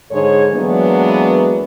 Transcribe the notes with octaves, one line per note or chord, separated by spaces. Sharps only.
G#2 D3 G#4 A4 C#5
E3 F#3 G#3 A#3 B3 D4